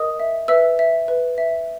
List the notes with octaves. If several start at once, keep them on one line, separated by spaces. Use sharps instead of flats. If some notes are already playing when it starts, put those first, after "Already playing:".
Already playing: A#4 D#5 D#6
E5
B4 E5 E6
E5
B4
E5